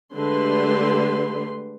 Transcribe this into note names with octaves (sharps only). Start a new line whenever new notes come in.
D3 G#3 A3 G4 B4 C6